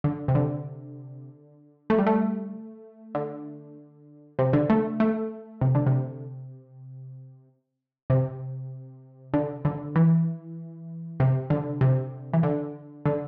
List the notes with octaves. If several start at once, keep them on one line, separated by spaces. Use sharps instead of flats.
D3
C3
D3
A3
G3
A3
D3
C3
D3
A3
A3
C3
D3
C3
C3
D3
D3
E3
C3
D3
C3
E3
D3
D3